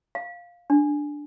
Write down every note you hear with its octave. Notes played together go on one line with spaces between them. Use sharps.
F5
D4